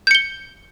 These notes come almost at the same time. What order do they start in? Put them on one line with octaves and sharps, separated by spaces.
G6 C#7 G7